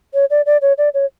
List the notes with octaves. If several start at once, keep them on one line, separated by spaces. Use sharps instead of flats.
C#5
D5
D5
C#5
D5
C#5